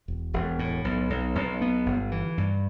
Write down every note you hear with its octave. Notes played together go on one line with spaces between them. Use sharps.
E1
E1
A2
B1
B1
B1
B3
G1
E3
G2